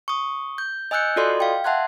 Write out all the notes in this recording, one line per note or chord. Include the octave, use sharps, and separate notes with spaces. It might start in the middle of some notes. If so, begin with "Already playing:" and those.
C#6 D#6
G6
D#5 G#5 E6 F#6 G6 C#7
F4 F#4 A4 D5 D#5 C6
F5 G5
E5 F#5 A5 C6 F#6 G#6